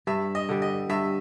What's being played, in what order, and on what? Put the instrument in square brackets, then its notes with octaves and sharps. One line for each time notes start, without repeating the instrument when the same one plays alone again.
[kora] G2 [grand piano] E5
[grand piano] D#5
[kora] D3 G3
[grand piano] D#5
[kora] G2 [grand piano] E5